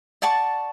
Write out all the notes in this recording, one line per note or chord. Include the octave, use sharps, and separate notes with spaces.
D5 F#5 A5 C#6